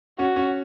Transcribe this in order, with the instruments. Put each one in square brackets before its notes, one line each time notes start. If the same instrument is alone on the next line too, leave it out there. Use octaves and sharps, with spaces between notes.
[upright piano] C#4 [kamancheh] F#4
[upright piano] C#4